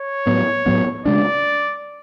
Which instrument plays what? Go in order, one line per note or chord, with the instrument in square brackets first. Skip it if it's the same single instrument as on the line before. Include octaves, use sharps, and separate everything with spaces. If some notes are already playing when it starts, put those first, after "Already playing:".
Already playing: [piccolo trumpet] C#5
[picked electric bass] A2 F#3 B3
A2 F#3 B3
[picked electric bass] C#3 G#3 D4 [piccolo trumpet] D5